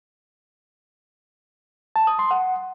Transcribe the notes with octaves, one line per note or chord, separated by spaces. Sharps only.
A5
D#6
C6
F#5